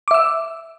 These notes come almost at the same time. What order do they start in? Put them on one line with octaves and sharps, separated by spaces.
D6 E5 E6